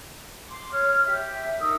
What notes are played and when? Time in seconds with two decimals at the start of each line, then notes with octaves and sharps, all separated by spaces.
0.50 C6 D6
0.72 C#5 F6
1.05 G4 E5
1.60 D#4 A#4 D#6 E6